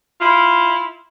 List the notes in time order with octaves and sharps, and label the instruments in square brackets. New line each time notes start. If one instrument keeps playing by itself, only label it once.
[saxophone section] E4 F4